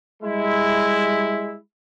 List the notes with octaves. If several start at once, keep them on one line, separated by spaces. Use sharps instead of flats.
G3 G#3 E4